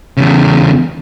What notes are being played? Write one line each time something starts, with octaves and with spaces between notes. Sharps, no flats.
E2 C#3